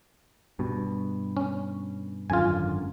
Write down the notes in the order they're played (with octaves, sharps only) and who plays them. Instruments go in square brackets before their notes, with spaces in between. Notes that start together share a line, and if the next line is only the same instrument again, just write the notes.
[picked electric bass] G2 B2
[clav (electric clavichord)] C#4
[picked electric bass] G#1 F#2 D3 [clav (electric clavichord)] F4 G#5